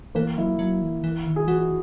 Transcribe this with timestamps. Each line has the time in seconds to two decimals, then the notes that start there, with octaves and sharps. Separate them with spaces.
0.15 E3 A#3
0.37 F#3 E4
0.59 F#3
0.82 E3
1.04 E3
1.26 D#3
1.36 G#4
1.47 E3 F#4